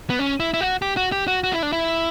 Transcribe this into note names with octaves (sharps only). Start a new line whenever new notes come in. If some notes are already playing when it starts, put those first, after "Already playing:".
B3
C#4
E4
E4
F#4
G4
F#4
G4
F#4
F#4
E4
D4
E4